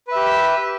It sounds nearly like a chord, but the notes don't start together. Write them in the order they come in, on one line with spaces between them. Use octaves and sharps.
B4 E5 G4